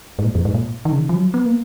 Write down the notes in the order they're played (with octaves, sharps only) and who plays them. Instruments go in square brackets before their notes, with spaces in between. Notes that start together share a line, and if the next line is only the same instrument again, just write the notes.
[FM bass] G#2
A#2
F2
G#2
A#2
D#3
C#3
D#3
F3
F#3
B3
A#3